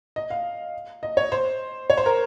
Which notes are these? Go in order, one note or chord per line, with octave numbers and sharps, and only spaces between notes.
D#5
F5
D#5
C#5
C5
C#5
C5
A#4